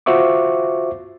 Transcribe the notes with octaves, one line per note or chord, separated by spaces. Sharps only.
F4 F#4 C5 E5 C#6 D6